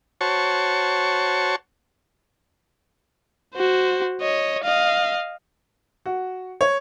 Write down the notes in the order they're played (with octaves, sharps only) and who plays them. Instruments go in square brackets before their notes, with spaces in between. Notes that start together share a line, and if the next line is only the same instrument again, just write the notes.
[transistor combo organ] F#4 C5 C#5 A5 C#6
[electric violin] F#4 C5
C#5 D#5
D#5 F5
[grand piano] F#4
C#5